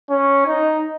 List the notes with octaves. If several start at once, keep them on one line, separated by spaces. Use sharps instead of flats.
C#4
D#4